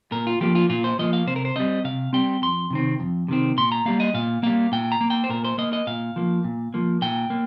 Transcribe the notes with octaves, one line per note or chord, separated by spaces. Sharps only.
A#2 A#4
F4
F3 A#3 G4
F4
A#2 F4
C5
F3 A#3 D#5
F5
C3 C5
A#4
C5
G3 C4 D#5
C3 F5
G3 C4 G5
F2 C6
C3 D#3 C4
F2
C3 D#3 C4
A#2 C6
A#5
G3 A#3 F5
D#5
A#2 F5
G3 A#3 F5
A#2 G5
A#5
A#3
G5
C5
A#2 A#4
C5
A#3 D#5
D#5
A#2 F5
F3 A#3
A#2
F3 A#3
A#2 G5
A#3